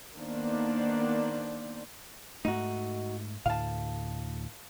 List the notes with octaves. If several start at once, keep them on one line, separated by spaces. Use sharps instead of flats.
D#3 A#3 B3 D4 C5 D5
G#2 A3 D#4 F#4
D2 A2 F5 A5